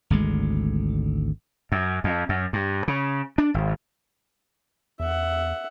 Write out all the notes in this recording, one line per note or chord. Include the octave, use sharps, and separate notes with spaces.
G#1 D2 D3 G#3
F#2
F2
F#2
G2
C#3
D4
G#1
E2 E5 F#5